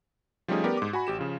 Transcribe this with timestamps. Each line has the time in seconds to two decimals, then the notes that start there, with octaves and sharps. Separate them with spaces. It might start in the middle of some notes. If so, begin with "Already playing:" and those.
0.48 F3 G3 A3 C#4 D#4 G#4
0.64 B3 G4 A#4 D5
0.77 G#2 D6
0.93 F#4 G#5 B5
1.07 A1 G4 E7
1.19 C#3 F3